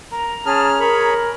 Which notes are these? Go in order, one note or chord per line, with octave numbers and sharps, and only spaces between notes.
A#4 A#5
C#4 G#4 A5 F6
G#4 A#4 C#5 B5